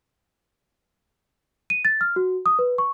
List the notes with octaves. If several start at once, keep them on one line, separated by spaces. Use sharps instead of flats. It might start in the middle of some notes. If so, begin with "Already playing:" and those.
D#7
A6
F6
F#4
D#6
B4
C#6